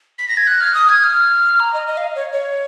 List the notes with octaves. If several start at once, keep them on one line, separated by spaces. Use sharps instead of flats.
B6
A#6
G#6
F#6
F6
D#6
G#6
F6
A#5
D#5
D#5
F5
C#5
C#5